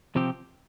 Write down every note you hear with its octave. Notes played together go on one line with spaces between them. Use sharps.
C3 F3 C4 G4